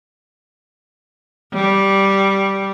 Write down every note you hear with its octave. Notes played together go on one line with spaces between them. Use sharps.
G3